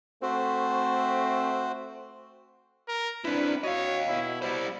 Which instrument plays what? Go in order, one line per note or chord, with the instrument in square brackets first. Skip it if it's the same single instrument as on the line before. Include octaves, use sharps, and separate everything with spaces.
[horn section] A3 C4 [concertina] F#4 C5
[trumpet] A#4
[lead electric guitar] C4 E4 [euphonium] D4 [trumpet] B4
[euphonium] F#4 [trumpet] C#5 [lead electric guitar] D#5 F5
[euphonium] B2 [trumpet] E4
[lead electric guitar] G3 C5 [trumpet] E4